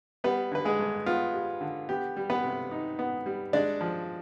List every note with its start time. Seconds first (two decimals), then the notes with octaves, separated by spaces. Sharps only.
0.24 G3 B3 B4
0.52 D3 B4
0.65 G#3 G#4
0.79 G2
1.06 B3 F4
1.34 G3
1.61 D3
1.89 B3 G4
2.17 G3
2.30 B3 B4
2.44 C3
2.71 D#4
2.99 B3
3.26 G3
3.53 G#3 D4 D5
3.81 F3